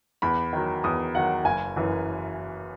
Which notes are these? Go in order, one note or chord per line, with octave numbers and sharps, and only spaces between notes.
E2 B5
D#3 F#3
E2 D#6
D#3 F#3 F#5
F#1 G#5
F#2 E3